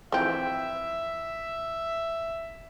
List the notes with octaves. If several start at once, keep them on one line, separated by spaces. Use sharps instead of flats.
E3 F3 C4 E5 G5